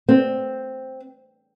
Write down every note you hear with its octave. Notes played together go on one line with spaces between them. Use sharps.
C4